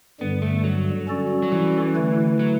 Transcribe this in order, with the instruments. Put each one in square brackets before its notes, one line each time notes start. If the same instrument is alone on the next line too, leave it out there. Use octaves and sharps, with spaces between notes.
[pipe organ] G2 D3 G3 [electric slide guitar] B3
[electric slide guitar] A3
F#3
[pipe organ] G3 C#4 F#4 A4 D5
[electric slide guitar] F#3
E3
[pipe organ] D3 A3 E4 B4
[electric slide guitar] F#3